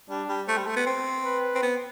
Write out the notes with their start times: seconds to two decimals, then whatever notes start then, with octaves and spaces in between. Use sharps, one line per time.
0.10 G3 D4
0.29 G3
0.48 A3 C5
0.58 G3
0.67 A3
0.76 B3
0.86 C4
1.25 B4
1.55 C4
1.63 B3